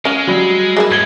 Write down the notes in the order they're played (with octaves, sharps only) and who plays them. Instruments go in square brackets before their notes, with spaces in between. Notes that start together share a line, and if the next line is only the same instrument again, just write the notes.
[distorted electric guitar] G#3 [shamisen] C#4 F5
[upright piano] F#3 G3
[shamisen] G#3 A#3 E4
[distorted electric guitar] D#2 G#2 [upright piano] G#6 F#7 G7